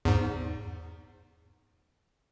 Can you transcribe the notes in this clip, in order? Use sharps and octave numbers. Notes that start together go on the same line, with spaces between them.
E2 G#2